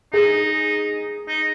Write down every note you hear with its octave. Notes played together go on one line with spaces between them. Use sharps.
D#4 G#4
D#4